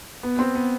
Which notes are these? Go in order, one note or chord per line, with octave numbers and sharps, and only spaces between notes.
B3
C4
B3